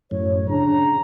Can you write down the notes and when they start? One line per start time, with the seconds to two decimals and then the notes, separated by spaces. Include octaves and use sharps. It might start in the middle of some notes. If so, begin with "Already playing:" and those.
0.11 F#2 A2 C#5
0.49 C#3 D4 A#5